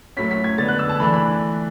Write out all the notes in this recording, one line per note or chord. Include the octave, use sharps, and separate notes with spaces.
A2 F#3 A3 C#4 B6
B6
G#6
D3 G#3 B3 D4 A6
F#6
E6
A5
E3 A3 D4 B5
B5